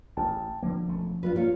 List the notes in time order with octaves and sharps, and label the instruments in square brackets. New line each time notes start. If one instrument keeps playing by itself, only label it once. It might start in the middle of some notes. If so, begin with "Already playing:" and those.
[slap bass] A1 [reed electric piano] G5 A5
[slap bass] D3 A#3 [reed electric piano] F3
[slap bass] E1 A3 C#4
[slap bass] G2 [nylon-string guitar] F4 F#4 B4
[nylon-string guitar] A#3 F4 C#5